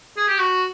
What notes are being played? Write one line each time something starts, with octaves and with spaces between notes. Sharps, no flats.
G#4
G4
F#4